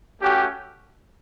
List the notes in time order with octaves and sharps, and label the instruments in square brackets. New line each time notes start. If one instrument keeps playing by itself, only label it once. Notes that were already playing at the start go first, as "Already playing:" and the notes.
[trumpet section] A3 C#4 F#4 G4